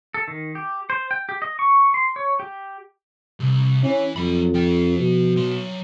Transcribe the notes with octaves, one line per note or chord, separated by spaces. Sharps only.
A4
D#3
G4
C5
G5
G4
D#5
C#6
C6
C#5
G4
C2
E3 C#4
F2 F#3 B5
F3 G5
B2
F#3 C6